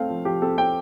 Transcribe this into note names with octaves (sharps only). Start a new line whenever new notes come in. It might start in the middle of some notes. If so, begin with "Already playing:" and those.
Already playing: A3 C4 F5
F3
F3 G4
C4 A4
C4 G5